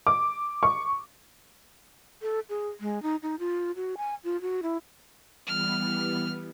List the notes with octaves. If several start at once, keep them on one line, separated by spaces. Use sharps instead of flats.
D6
C#6
A4
G#4
G#3
D#4
D#4
F4
F#4
G#5
F4
F#4
E4
E3 G3 B3 F6